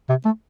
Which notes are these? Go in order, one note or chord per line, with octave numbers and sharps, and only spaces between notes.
C3
A3